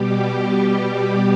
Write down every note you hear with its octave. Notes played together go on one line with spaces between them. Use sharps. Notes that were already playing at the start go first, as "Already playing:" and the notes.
Already playing: B2 G3 G4